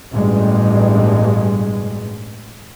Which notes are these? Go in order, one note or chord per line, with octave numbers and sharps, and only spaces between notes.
A1 G2 B2 G3 G#3